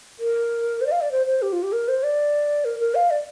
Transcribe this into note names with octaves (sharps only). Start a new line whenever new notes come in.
A#4
C5
D5
F5
D5
C5
C5
G4
F4
G4
A#4
C5
D5
A#4
A#4
F5
D5